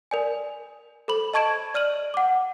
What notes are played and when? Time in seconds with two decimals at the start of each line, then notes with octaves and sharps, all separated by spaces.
0.11 A#4 D5 G#5
1.08 A4 C5 B5 F#7
1.34 D#5 A5 C#6 G#6 D7 E7
1.74 D5 F6 D#7 F#7
2.14 F#5 D6